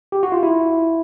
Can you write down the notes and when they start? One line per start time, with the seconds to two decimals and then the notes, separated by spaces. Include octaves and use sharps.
0.12 G4
0.23 F#4
0.32 F4
0.43 E4